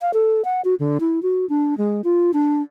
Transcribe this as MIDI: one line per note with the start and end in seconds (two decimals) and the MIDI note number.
0.02 0.11 77
0.13 0.44 69
0.45 0.61 78
0.64 0.75 66
0.79 0.98 50
1.00 1.22 64
1.22 1.48 66
1.49 1.77 62
1.78 2.01 56
2.04 2.31 65
2.33 2.62 62